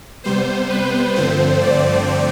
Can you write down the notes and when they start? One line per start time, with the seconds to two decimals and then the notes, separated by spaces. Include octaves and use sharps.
0.24 C3 G3 B3 C5
0.70 B4
1.16 G2 D3 F3 A3 C4 C5
1.61 D5